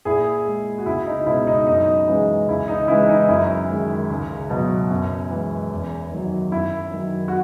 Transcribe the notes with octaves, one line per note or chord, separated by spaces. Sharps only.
A#2 E4 G#4
G#3
F#4
C#2 E4
D#4
B2 G#3 E4
D#4
F#2 D#4
C#3 E3 G#3
C#2 E4
D#4
C#3 E3 G#3 E4
D#4
F#2 E4
D#3 G#3
C#2
B2 F#3
F#2
E3 G#3
E2
D#3 F#3
F#2 E4
D#3 F#3
F#4